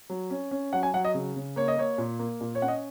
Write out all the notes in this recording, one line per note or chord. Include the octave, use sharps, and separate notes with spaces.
F#3
C#4
C#4
F#3 F#5
G#5
F#3 F#5
D#5
C#3
C#3
A#3 C#5
D#5
A#3 C#5
A#2
A#3
A#2
C#5
C#4 F#5
D#5